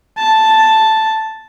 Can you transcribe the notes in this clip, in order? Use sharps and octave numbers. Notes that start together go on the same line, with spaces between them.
A5